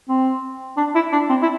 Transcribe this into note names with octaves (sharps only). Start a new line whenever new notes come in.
C4
D4
E4
D4
C4
E4